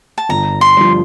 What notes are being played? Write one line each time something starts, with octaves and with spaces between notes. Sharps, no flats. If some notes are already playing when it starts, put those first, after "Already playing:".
A5
G1 A#5
C6
G2 F3